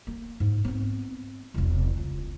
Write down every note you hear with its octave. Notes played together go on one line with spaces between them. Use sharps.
A#3
G#2
B3 C4
E1 C2
C#2